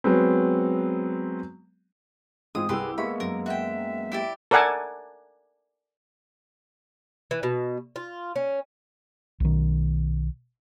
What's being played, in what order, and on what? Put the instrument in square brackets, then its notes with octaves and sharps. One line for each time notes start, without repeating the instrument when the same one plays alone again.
[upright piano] F#3 G#3 B3 C4
[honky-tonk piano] A1 G#2 F4 [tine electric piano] G#3 C4 [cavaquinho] D#6
[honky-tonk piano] C2 G3 E6 [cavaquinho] G4 C6 [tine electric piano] G#4 B4
[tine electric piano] G#3 A#3 B3 [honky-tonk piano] E5 C#6 C#7 [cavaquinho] B5
[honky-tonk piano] F#2 [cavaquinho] A#4
[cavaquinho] F#4 G5 [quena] E5
[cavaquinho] E4 G4 D5
[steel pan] A4 A#4 D5 F#5 G#5 A5
[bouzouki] E3
B2
F4
C#4
[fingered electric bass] B1 D#3